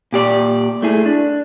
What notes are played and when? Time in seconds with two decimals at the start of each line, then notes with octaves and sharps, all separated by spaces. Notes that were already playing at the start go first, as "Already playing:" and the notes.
0.12 A#2 G4 D5
0.82 A3 E4 G#4
1.06 D4